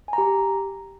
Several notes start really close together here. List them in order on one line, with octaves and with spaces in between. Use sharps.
G#5 A#5 G4